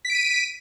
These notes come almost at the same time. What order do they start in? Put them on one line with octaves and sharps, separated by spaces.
B6 D7 D#7